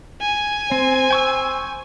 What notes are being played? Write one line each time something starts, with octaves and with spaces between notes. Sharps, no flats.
G#5
C4 C5
G5 C#6 E6